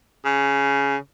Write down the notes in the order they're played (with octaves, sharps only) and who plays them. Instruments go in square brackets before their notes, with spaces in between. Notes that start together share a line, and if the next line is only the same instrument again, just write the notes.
[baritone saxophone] C#3